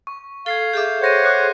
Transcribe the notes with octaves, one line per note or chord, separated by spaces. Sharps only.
C#6
A4 F5 G#6 C7 G7
G#4 A4 E5 D6 G6
C5 C#5 F#5 G6 A#6 D#7
D6 F#6 C7